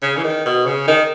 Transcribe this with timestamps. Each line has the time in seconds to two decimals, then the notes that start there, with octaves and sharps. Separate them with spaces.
0.02 C#3
0.17 E3
0.24 D#3
0.46 B2
0.66 C#3
0.87 D#3